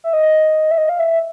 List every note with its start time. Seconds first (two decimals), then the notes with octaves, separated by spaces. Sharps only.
0.04 E5
0.13 D#5
0.71 E5
0.78 D#5
0.89 F5
0.99 E5